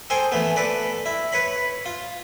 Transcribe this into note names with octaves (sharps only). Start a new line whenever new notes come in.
G#4 A4 C5 G5 G#5
E3 A3 B3
A4 B4 D5
E4
B4 C#5 B5
F4